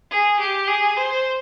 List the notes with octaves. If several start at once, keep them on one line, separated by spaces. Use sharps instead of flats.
G#4
G4
G#4
C5